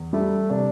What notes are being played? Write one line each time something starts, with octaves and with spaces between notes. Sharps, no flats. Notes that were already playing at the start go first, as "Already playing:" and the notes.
Already playing: E2
G3 A3
C3 D4